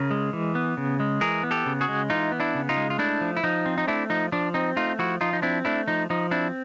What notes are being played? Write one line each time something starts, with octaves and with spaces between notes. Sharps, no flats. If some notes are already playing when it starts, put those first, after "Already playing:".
Already playing: C#3 G#4 A#4
G#3
E3
B3
C#3
G#3
E3 G#4 A#4
B3
G4 A4
C#3
F#4 G#4
G#3
E3 D#4 F4
B3
D4 E4
C#3
D#4 F4
G#3
F4
A3 D4 E4
F3
E4
F3 D#4
C4
D#4
A3 D4 E4
F3 D#4
F3 D4
C4 D#4
A3 D#4 F4
F3 E4 F#4
F3 D#4 F4
D#4
C4 D4 E4
A3 D4 E4
F3 D#4
F3 D#4
C4 D4 E4